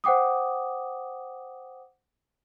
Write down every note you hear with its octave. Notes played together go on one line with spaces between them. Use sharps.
C5 F#5 G5 D6 D#6